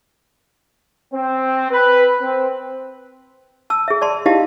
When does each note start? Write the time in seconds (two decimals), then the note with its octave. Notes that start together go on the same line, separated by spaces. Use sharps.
1.13 C4
1.71 B4
2.20 C4
3.70 A5 E6
3.88 G#4 E5
4.01 D5 A5 C6
4.26 D#4 E4 G4 D#5 F5 A5